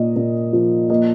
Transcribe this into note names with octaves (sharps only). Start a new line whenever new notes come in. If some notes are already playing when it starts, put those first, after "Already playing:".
Already playing: A#2 A#3 D#5
A#2
F3
A#3 D#5